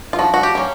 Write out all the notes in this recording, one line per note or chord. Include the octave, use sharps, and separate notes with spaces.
F4
F3 F#4
F#4
G4
A#3 C#4